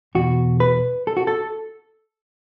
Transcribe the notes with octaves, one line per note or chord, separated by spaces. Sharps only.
E2 B2 F#4
B4
A4
F#4
A4